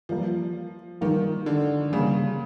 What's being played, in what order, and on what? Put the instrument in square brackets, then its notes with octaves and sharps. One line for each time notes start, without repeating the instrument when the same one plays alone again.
[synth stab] E3 G3 A#3 [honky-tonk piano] F3
[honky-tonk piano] D#3 [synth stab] E3 G3 A#3
[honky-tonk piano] D3
[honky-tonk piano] C#3 [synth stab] E3 G3 A#3